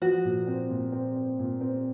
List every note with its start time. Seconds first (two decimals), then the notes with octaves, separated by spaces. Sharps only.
0.02 F3 F#4
0.25 A#2
0.47 C4
0.70 A#2
0.92 C4
1.16 C4
1.39 A#2
1.61 C4